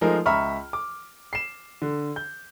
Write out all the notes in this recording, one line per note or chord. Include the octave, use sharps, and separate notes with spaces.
F3 G#3 A3 D#4 A#4
C#2 E5 A#5 B5 C#6 F6
D6
C7 E7
D3
G6